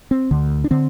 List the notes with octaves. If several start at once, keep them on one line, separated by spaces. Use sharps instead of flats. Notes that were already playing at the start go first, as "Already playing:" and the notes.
C4
D2 D3
D4
D3 C4